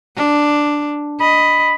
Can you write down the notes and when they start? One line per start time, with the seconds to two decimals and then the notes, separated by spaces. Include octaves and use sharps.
0.16 D4
1.20 D#5 B5